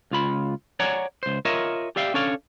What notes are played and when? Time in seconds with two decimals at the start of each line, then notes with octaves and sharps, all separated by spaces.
0.11 C#2 F4 B5
0.80 C#5 D5 F#5 G#5 A#5
1.23 C#2 C5
1.45 F4 A#4 C#5 D#5 E5
1.96 G4 D5 E5 F5 G5
2.14 C#4 D4 A4 C#5 D5 F5